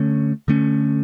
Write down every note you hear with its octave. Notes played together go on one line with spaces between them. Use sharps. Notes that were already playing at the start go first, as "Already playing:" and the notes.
Already playing: D3 A3 C#4
D3 A3 C#4